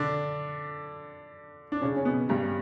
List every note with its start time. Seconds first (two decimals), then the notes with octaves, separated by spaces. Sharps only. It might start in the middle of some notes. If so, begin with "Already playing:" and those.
Already playing: D3 D4
1.72 D4
1.82 C#3 C#4
1.96 C#4
2.05 B2 B3
2.29 G2 G3